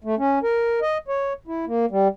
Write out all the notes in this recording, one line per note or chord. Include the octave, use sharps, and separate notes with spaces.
A3
C#4
A#4
D#5
C#5
E4
A#3
G3